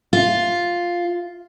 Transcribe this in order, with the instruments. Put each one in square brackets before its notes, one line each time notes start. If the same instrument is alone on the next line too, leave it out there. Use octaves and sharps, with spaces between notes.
[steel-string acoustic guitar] F4